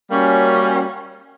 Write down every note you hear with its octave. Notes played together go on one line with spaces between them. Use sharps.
G3 A#3 C#4 F#4